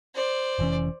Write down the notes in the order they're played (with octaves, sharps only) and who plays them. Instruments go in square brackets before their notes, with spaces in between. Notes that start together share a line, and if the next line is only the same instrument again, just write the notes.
[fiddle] C5 D5
[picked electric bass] F1 E3 C#4